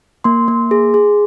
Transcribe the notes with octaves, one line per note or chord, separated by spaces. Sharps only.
A#3 C6
A#3
G#4
G#4